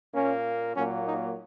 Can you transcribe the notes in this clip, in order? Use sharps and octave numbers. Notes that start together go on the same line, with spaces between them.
A#2 A#3 C#4
A#2 F#3 A#3 C#4
D#4